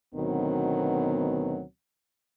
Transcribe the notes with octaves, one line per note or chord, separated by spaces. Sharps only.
D2 B2 D#3 F#3 B3 C4